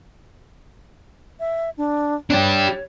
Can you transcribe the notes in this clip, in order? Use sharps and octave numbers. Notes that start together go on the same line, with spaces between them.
E5
D4
D4 G4 C#5